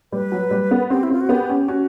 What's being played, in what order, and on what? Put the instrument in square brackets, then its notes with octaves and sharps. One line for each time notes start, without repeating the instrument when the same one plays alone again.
[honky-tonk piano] G3 [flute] B4
[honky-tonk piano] F#3
G3
B3
[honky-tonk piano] C4 [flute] G4
[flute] E4
[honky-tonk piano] C4 [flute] F4
[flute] F#4
[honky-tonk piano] B3 [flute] G4
[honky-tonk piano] C#4
[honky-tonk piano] C#4 [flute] F#4